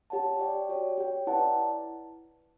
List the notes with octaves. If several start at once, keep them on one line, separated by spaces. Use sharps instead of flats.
G4 C#5 F#5 A5
G4 D5 G5
F#4 C#5 G5
G4 C#5 G5
E4 B4 D5 F#5 A5